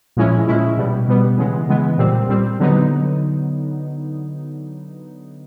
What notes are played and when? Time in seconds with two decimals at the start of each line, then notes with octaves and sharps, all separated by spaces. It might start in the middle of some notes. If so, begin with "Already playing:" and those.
0.17 A#2 F3 G#3 C#4 E4
0.48 A#2 F3 G#3 C#4 E4
0.77 B2 G3 B3
1.08 B2 G3 B3
1.38 C#3 E3 G#3 B3
1.68 C#3 E3 G#3 B3
1.98 A#2 G3 C4
2.29 A#2 G3 C4
2.59 D3 F#3 B3 D#4